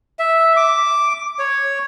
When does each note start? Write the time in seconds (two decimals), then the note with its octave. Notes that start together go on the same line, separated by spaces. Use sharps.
0.19 E5
0.56 D6
1.39 C#5